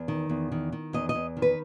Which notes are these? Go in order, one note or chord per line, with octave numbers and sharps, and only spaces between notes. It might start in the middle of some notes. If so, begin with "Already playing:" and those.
Already playing: E2
D#3
E2
D#3
D#3
E2 D#5
D#5
E2
D#3
B4